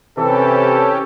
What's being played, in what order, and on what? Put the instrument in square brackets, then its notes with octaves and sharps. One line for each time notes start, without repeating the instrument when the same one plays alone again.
[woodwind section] C3 E3 [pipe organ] C#4 G4 [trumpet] A4